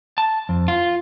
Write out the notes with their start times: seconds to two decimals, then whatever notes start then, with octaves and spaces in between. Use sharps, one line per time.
0.18 A5
0.49 F2
0.68 F4